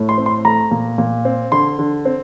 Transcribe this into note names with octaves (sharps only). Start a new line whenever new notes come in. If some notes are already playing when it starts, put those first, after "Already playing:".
Already playing: A2 A3
C6
C4
C6
A3 A#5
A#2
A#2
C4
D3 C6
D3
C4